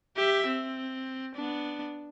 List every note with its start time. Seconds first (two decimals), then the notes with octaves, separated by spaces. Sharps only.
0.17 G4 E5
0.46 C4
1.35 B3 D4